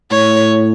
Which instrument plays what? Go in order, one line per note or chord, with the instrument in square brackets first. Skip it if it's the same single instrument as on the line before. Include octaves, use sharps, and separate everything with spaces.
[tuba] A2 [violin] C#5